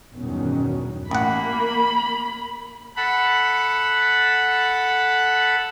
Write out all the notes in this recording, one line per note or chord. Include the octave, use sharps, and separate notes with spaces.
E2 G2 B2 D#3 F#3 C#4
A1 A#3 F#5 B5
A4 F#5 B5